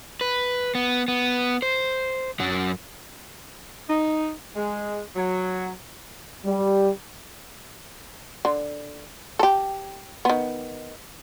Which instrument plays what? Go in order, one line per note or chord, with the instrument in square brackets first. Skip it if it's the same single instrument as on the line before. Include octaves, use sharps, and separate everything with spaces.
[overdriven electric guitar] B4
B3
B3
C5
F#2 F#3
[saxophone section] D#4
G#3
F#3
[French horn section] G3
[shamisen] D3
G4 A4
D#3 B3